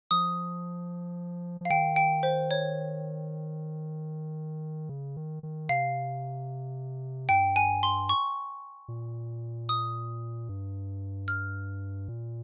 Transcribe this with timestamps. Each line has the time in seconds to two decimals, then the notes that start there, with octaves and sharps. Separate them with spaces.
0.11 F3 D#6
1.61 F3 F5
1.70 D#3 G5
1.96 G5
2.23 C5
2.51 C#5
4.89 C#3
5.17 D#3
5.43 D#3
5.69 C3 F5
7.29 G2 G5
7.56 G#5
7.83 C6
8.09 C#6
8.88 A#2
9.69 D#6
10.49 G2
11.28 F6
12.08 A#2